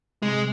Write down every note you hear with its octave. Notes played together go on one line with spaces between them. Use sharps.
C3 G#3